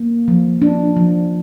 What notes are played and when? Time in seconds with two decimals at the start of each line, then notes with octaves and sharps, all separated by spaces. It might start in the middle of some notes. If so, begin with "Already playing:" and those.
Already playing: A#3
0.28 F3
0.62 D4
0.97 F3